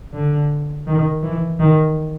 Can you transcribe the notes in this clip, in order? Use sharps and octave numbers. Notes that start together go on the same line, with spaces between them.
D3
D#3
E3
D#3